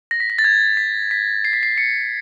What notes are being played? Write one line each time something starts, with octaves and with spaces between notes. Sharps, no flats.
A#6
B6
A#6
A6
G#6
B6
B6
C7
B6
C7
C#7